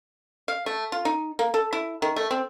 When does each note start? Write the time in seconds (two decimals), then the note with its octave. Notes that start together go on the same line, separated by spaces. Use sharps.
0.48 F5
0.66 A3
0.92 F4
1.05 D#4
1.39 A#3
1.54 A4
1.73 E4
2.02 D#3
2.16 A3
2.31 C4